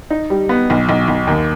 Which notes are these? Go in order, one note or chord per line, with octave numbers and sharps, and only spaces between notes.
D#4
G3
B3
B1
B1
B1
D#2